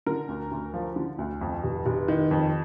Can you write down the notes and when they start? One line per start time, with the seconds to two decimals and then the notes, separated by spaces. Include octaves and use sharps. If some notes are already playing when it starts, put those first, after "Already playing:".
0.06 D3 A#4
0.29 D2
0.51 D2
0.74 F3
0.96 D3
1.19 D2
1.41 F2
1.63 F1
1.86 F1
2.08 D#3
2.31 F2